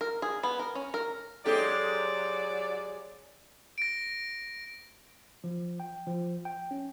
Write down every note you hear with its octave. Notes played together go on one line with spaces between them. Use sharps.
A#4
G#4
B3
A#4
C#4
A#4
F#3 G#3 C#4 G4 A4 D5
A#6 D7
F3
G5
F3
G5
C#4